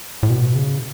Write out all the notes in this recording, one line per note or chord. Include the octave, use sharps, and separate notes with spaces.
A2
B2
C#3